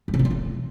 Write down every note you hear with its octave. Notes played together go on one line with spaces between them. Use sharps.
G3
C3
F#3
G3
E3